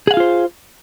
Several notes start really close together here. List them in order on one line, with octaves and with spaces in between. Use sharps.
G#4 F#5 F5 F4 C5